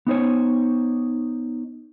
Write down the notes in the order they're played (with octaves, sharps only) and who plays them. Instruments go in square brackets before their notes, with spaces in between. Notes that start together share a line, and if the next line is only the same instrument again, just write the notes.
[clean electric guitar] B3 D#4 C5 C#5